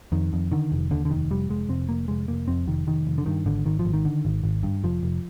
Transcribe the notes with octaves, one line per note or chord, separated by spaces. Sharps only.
F2 D#3
F2
D3 D#3
F1
D#2 D3
D3
F1 D#3
F1 G3
F1 G#3
F1 C4
F1 A#3
F1 G#3
F1 A#3
F2 C4
F1 D#3
F1 D#3
F1
D3
G2 D#3
G#1 D3
G#1 D#3
F3
G#1
D#3
D3
G#1
G#1
G2
F1 F3
F1